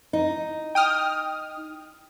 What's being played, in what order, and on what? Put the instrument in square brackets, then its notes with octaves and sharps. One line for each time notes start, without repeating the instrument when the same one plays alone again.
[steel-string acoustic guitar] D#4
[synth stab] G5 D#6 F6